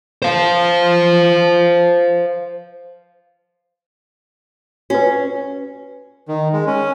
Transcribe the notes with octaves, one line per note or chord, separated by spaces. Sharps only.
C5 F5
C#4 F#4 B4
D#3
G#3
C#4